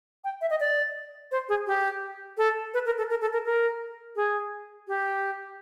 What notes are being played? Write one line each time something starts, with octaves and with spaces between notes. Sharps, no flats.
G5
E5
D#5
D5
C5
G#4
G4
A4
B4
A#4
A4
A#4
A4
A#4
A#4
G#4
G4